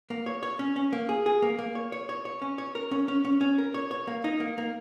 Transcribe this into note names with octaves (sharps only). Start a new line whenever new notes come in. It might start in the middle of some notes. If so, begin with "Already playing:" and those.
A#3
C#5
C#5
C#4
C#4
A#3
G#4
G#4
A#3
A#3
C#5
C#5
C#5
C#5
C#4
C#5
A#4
C#4
C#4
C#4
C#4
A#4
C#5
C#5
A#3
D#4
A#3
A#3